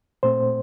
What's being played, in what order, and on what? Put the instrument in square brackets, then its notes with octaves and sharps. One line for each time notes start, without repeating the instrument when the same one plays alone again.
[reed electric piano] A#2 A3 C4 C5